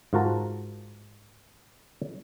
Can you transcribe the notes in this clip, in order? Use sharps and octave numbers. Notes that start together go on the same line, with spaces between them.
G#2 F4 F#4 A#4 A5